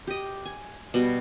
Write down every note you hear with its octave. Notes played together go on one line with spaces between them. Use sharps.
G4 D#5
G#5
B2 G3 B3